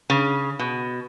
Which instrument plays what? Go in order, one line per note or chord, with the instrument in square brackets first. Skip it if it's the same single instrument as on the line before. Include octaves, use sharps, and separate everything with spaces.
[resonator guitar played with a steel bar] C#3
B2